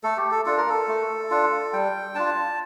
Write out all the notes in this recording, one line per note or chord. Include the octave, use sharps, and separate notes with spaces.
A3 A4
G4
A4
D4 F4 A4
A#4
A4
A3
D4 F4
G3 G5
D4 F4 A5